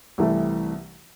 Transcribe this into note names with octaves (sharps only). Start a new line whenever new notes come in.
C2 C3 E3 A3